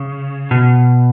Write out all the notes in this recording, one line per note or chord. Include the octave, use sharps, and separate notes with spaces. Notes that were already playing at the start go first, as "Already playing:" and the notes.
Already playing: C#3
B2